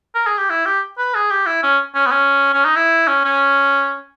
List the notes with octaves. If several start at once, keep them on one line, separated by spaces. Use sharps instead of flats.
A#4
G#4
G4
E4
G4
B4
G#4
G4
E4
C#4
C#4
B3
C#4
C#4
D#4
E4
C#4
C#4